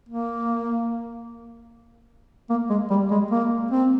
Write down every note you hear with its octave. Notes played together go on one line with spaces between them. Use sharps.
A#3
A#3
G#3
G3
G#3
A#3
C4